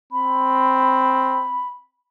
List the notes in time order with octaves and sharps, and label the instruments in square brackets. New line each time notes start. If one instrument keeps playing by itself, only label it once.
[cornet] C4 [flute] B5